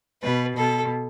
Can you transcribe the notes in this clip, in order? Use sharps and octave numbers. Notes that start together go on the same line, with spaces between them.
B2 B4
B2 A4